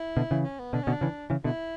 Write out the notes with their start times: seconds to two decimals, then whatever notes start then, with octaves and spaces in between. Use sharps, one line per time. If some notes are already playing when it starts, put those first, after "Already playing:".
Already playing: E4
0.17 B2 D3
0.31 C#3 E3
0.44 C#4
0.59 B3
0.73 B2 D3 D4
0.83 C#4
0.87 B2 D3
0.92 D4
1.01 C#3 E3
1.30 C#3 E3
1.44 B2 D3 E4